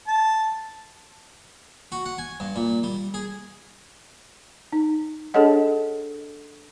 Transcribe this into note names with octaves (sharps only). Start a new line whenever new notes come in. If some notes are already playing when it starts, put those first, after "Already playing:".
A5
F#4
F#5
G#5
G2
A#2
G3
G#4
D#4
D4 G#4 A4 C#5 D#5 F#5